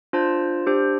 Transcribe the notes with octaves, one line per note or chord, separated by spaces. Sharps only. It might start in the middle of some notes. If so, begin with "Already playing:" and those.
D4 F4 C5 A5
D4 G4 C5